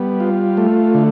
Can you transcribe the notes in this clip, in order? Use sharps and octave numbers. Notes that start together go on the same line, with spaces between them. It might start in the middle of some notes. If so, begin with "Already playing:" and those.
Already playing: G3 B3
F4
A3
D3